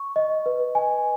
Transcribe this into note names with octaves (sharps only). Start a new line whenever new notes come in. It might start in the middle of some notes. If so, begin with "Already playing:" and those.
Already playing: C#6
D#5
B4
G#5